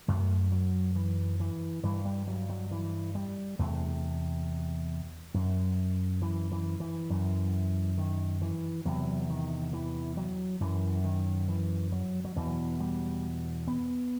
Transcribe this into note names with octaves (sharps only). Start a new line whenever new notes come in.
F#2 A3
F#3
E3
E3
G2 E3
G3
F#3
F#3
E3
G3
E2 C3 A3
F#2
E3
E3
E3
F#2
D#3
E3
E2 C3 F#3
D#3
E3
F#3
F#2 E3
D#3
E3
F#3
F#3
E2 B2 E3
G3
B3